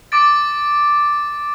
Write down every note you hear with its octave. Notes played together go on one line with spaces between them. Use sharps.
D6 A6 D7